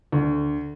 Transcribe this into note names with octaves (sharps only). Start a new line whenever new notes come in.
D2